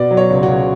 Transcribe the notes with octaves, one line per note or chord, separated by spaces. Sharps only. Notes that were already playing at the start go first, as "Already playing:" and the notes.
Already playing: B2 D5
F#3
C#5
C#2
F#4
C#2